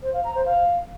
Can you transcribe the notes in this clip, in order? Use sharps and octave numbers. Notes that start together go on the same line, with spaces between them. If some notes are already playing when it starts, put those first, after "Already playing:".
C5
F5
A#5
C5
F5